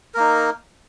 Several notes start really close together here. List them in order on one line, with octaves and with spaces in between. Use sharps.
A#4 A#3 D#4